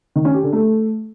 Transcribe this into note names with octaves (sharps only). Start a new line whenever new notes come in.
D#3
C#4
G4
D3
A3